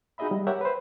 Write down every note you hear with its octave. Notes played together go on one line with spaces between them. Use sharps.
D#4 F#4 G#4 D#5 E5 B5
G3
G4 A#4 C#5 E5 F#5
B4 C5